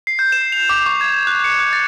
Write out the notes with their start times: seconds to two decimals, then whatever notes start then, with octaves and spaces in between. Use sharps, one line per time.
0.07 C7
0.19 G6
0.32 E7
0.52 F7
0.69 D6
0.86 C#6
1.01 G#6
1.14 E7
1.27 F#6
1.44 C#7
1.59 F#6
1.73 A6